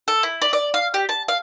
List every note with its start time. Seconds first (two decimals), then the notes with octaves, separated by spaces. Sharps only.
0.08 A4
0.23 E4
0.42 D5
0.53 D5
0.74 F5
0.94 G4
1.09 A5
1.28 F5